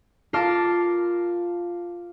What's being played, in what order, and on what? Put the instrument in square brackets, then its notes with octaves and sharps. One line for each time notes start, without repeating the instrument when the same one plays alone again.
[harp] F4 A#4 F5 A5 D6